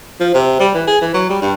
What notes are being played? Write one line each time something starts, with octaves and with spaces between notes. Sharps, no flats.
F3
C3
G3
E3
G#4
E3
F#3
G3
G2